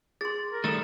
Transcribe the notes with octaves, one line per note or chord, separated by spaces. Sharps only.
G#4 C6 A6
A#4
D#3 G3 A3 A4 B5 A6 E7